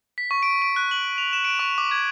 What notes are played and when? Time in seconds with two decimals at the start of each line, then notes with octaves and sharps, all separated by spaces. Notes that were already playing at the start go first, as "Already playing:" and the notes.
0.18 B6
0.31 C#6
0.43 D7
0.62 D7
0.76 F#6
0.91 F#7
1.18 F7
1.33 E7
1.45 D7
1.59 C#6
1.78 D6
1.91 G#6